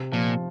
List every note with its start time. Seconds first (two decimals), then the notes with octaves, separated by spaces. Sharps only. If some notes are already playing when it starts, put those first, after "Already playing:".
Already playing: C3
0.12 A#2 F3